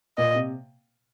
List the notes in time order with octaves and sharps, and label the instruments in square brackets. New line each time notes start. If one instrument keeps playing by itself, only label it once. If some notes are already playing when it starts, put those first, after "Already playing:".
[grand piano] A#2 [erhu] D#5
[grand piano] C3